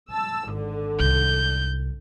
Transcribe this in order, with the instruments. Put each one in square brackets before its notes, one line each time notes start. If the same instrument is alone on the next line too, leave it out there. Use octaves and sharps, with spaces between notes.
[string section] A5 E6
G#1 D3
[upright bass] C2 [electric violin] G6